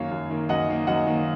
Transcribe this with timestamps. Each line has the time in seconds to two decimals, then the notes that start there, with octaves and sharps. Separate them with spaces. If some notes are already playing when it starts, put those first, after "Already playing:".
Already playing: F#2 D#3 A#3 C#5 F5
0.11 F#2
0.30 D#3 A#3
0.49 F#2 D#5 F#5
0.69 D#3 A#3
0.87 F#2 D#5 F#5
1.07 D#3 A#3